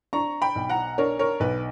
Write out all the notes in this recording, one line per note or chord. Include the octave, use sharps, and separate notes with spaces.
D4 A#5 C#6
G5 B5
B1
F#5 A#5
D4 A#4 C#5
A#4 C#5
B1 B4